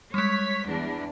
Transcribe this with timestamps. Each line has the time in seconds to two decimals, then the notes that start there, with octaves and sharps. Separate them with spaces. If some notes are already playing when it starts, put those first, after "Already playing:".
0.14 G3 G#3 C#5 B6
0.67 E2 D4